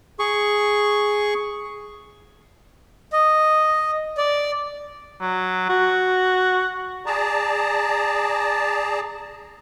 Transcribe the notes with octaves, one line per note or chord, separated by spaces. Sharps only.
G#4 C#6
D#5
D5
F#3
F#4
G#4 D5 A5 A#5